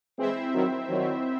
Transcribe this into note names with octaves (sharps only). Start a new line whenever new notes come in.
E3 G#3 C4 E4 C5 E5
D#3 F#3
D#3 F#3